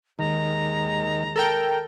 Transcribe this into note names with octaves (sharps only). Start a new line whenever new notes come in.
D#2 D#3 G#3 A#5
A4 A#4 G5